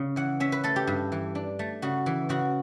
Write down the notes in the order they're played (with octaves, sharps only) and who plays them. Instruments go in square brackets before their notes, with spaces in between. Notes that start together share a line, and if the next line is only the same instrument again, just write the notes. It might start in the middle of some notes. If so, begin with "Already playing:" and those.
Already playing: [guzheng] C#3
E3 F#5
C#4 E5
B4
A3 A4
G4
G2
E3
D4
A3
C#3 F#4
E3
C#3 F#4